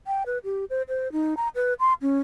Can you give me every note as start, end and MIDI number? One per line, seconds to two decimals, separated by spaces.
0.07 0.23 79
0.26 0.38 71
0.44 0.65 67
0.70 0.82 72
0.88 1.11 72
1.12 1.34 63
1.37 1.48 82
1.55 1.74 71
1.80 1.93 84
2.02 2.20 61